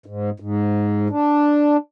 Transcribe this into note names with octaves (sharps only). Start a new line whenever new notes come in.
G#2
G#2
D4